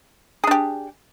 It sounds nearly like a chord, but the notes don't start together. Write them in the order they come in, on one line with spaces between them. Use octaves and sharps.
G#4 D4 G4